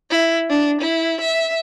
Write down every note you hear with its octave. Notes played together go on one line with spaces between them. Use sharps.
E4
D4
E4
E5